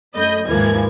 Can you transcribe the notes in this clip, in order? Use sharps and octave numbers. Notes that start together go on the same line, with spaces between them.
F#2 A3 D#5 B5 G6
D#2 G#2 E3 F3 A#3 G#6